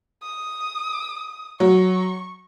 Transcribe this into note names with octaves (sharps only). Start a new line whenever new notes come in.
D#6
F#3 C#6